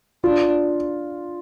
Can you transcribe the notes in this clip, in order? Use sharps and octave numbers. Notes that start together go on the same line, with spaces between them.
D4 F4